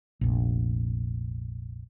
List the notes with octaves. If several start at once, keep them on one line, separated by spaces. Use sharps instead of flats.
F1 A#1